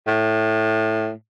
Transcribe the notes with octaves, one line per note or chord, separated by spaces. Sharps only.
A2